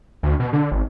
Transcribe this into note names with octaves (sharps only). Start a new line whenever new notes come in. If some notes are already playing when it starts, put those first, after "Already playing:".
D2
B2
D3
G#1